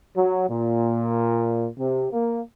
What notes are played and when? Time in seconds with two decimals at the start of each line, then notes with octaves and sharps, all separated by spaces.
0.17 F#3
0.50 A#2
1.79 C3
2.12 A#3